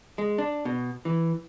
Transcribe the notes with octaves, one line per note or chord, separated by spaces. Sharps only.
G#3
D4
B2
E3